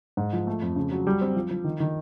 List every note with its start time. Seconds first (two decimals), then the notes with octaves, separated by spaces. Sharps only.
0.17 G#2
0.33 F3
0.47 A3
0.62 F2
0.76 C#3
0.92 F#3
1.07 G3
1.21 C4
1.36 F3
1.51 F3
1.64 D#3
1.80 D#3